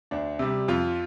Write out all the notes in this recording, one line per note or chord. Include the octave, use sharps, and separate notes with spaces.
D2 D4
C3 G3
F2 F4